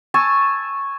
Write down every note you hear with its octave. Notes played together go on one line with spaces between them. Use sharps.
G#5 A5 C#6 E6